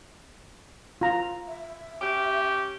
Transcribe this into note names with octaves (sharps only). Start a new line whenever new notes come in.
F4 A#5
E5
C#4 G4